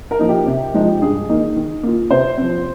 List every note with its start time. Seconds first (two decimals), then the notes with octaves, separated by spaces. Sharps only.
0.11 A#4
0.19 F3 A#3 D#4
0.29 G4
0.46 C3
0.74 F3 G#3 D#4
1.02 G2 G#4
1.29 D#3 A#3 D#4
1.56 D#3
1.83 A#3 F4
2.10 C3 C5
2.37 F3 C4